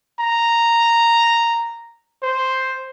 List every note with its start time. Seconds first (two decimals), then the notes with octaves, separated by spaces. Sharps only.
0.20 A#5
2.23 C5